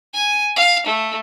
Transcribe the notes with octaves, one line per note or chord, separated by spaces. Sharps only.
G#5
F5
A3